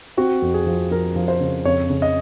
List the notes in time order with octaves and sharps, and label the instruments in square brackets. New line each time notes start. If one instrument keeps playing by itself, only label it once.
[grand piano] C4 F#4
F2
G#4
F3
F3 A#4
F3
C5
C#3
F2 C#5
C#3
D#5